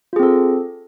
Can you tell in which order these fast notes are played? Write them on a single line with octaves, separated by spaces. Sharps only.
F4 G#4 C4 A4